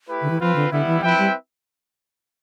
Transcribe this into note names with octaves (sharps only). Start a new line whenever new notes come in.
A3 E4 G4 B4
D3
E3
F3 C4 F4 B4
D3
D3 G3 B3 E4
E3
F3 C4 E4 B4 E5 G5
G3